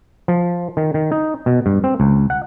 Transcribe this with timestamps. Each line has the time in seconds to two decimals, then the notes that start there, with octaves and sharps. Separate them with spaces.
0.28 F3
0.77 D#3
0.94 D#3
1.12 D#4
1.46 B2
1.66 G2
1.84 C4
2.00 C#2
2.30 F#5